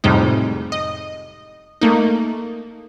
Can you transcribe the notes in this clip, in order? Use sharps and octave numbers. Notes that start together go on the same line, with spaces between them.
F2 A2 C3 G3 G#3 D#4
D#5
A3 A#3 D#4